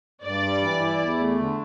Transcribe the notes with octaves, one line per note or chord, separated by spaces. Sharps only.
G2 D5
G3
E3
E4
E2
A3
D3